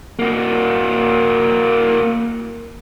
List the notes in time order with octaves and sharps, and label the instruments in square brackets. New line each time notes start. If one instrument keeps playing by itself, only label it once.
[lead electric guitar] A#3 F#4